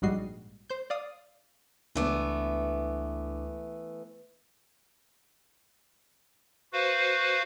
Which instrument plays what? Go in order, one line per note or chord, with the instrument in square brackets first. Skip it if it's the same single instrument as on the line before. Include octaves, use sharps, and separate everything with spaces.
[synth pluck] A#1 G#2 G3 F#4 D#5 C7
C5 G6
D5 F5 D#6
[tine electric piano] C#2 D4 D6 [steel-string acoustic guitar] E3 A3 B3
[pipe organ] F#4 B4 C5 F5